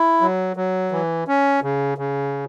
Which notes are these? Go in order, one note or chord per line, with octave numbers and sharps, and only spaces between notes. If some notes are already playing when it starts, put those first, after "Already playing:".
Already playing: E4
F#3
F#3
E3
C#4
C#3
C#3